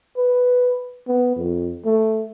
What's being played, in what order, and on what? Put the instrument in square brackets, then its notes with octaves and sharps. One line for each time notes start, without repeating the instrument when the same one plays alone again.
[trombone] B4
B3
F2
A3